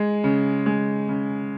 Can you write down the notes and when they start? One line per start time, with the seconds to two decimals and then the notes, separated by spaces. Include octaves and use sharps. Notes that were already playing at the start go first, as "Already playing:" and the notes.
Already playing: G#3
0.24 C#3
0.66 G#3
1.09 C#3